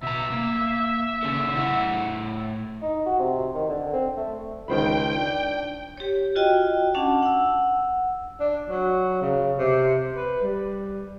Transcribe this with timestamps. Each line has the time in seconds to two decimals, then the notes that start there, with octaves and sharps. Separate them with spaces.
0.03 B2 E5 A#5
0.32 A#3
1.23 C#3 C#4 A4
1.56 A2 E4 F#5
2.82 D#4
3.06 F#4
3.20 C3
3.55 D#3
3.69 D3
3.94 C4
4.17 A3
4.68 C#2 D#3 C5 G5 B5
5.16 D4
5.97 G4 C#5
6.36 F4 F#4 D#5 G5
6.94 C#4 D4 F#5 A5
7.22 F#5 E6
8.40 D4
8.70 F#3
9.22 C#3
9.58 C3
10.16 B4
10.42 G3